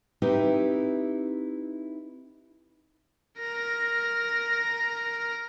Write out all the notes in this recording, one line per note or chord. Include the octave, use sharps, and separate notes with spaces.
C4 D#4 E4 G4 B4
A#4 A#6